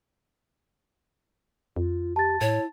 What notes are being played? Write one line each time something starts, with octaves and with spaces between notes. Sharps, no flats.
F2 F4
G4 A5 A6
A2 E4 C#5